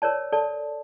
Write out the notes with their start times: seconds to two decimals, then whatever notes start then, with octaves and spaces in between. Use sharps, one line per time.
0.02 A#4 C#5 D5 A5
0.32 A4 D5 A5